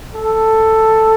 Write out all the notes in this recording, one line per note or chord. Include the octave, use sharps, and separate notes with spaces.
A4